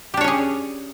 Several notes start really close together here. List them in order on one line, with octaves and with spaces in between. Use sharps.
G4 D4 C#5 C#4 G#4